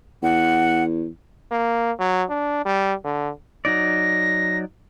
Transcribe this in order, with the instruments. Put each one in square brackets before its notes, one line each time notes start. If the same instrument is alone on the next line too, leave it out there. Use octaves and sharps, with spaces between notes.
[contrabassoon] E2 [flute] F#5
[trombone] A#3
F#3
D4
G3
D3
[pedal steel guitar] F#3 D#4 D5 [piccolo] A#6